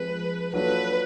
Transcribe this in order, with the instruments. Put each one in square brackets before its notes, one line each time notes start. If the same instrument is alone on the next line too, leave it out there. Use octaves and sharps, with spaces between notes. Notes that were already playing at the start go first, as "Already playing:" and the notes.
Already playing: [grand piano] F3 G#3 C4 [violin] B4
[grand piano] F#3 A#3 D4 F4 A4 [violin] B4